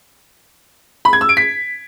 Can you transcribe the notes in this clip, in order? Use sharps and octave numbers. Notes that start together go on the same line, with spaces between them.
B5
G#6
E6
D7
B6